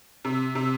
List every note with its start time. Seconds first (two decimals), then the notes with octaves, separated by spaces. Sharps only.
0.25 C3
0.55 C3